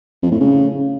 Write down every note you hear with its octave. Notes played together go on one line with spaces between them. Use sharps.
F2
A2
C#3